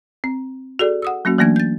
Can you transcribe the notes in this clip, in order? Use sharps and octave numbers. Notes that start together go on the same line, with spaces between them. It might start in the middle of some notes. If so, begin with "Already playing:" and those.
C4
F#4 G#4 A4 D5
F#5 D#6 E6
F#3 A#3 C#4 F#4
E3 F#3 A3 A#3 D4 G#6
G6 A6